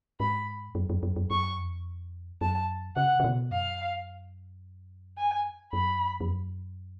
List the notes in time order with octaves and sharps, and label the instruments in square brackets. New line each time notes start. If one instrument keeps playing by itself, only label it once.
[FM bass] G#2 [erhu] B5
[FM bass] F#2
F#2
F#2
F#2
[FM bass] F#2 [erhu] C#6
[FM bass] F2
[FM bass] F#2 [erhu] A5
[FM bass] C#3 [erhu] F#5
[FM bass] C#3
B2
[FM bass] F#2 [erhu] F5
[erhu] G#5
[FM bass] F#2 [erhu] B5
[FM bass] F2
F#2